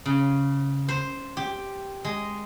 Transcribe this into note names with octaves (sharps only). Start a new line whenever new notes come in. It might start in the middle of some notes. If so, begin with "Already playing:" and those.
C#3
C5
G4
G#3